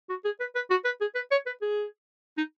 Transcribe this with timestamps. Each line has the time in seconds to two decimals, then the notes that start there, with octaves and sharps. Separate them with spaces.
0.09 F#4
0.25 G#4
0.40 B4
0.55 B4
0.70 F#4
0.85 B4
1.01 G#4
1.15 B4
1.31 C#5
1.46 B4
1.62 G#4
2.38 D#4